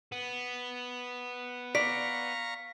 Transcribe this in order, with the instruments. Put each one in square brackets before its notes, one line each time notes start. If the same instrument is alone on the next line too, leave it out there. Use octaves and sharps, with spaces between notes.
[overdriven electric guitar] B3
[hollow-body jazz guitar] D5 [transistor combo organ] F5 A#5 C#6 [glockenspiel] B6